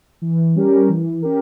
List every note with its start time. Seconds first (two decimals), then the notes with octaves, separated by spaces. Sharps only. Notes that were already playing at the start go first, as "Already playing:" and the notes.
0.22 E3
0.56 G3 C#4 G4 A#4
0.89 E3
1.22 C#4 G4 A#4